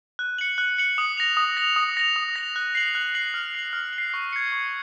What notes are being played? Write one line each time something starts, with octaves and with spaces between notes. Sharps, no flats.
F#6
C#7 F#7
F#6
C#7 F#7
D#6
A#6 F7
D#6
A#6 F7
D#6
A#6 F7
D#6
A#6 F7
F#6
C7 F#7
F#6
C7 F#7
F6
C7 F#7
F6
F#7
C7
C#6
G#6 C#7
C#6